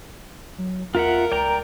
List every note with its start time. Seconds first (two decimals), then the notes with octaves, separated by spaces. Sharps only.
0.58 F#3
0.95 E2 F4 A#4 E5 F#5
1.32 C#2 D5 G5 A#5